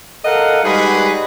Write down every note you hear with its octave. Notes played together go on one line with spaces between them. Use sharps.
A4 A#4 D#5 F5 F#5
G3 G#3 D#4 F#4 G#4 B4